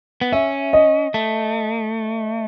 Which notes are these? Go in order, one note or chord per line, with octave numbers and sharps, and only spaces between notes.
B3
C#4 E5
D#5
A3